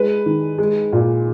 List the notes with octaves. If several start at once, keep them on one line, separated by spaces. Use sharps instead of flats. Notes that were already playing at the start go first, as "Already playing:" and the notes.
Already playing: G#3 B4
D#3
G#3
A#2